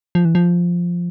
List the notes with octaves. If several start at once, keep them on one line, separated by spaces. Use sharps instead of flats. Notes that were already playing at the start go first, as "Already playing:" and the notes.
F3
E3
F3